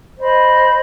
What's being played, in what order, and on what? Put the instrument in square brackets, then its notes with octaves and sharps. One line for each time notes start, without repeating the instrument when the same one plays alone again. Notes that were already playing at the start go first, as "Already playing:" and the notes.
[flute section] C5 D#5 B5